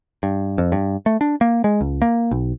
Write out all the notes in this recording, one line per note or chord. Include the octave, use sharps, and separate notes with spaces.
G2
F2
G2
A3
D4
A#3
G#3
C#2
A#3
B1